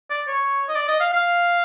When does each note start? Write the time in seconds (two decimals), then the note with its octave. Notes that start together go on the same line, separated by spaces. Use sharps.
0.10 D5
0.27 C#5
0.69 D#5
0.75 D5
0.88 D#5
1.01 F5
1.13 F5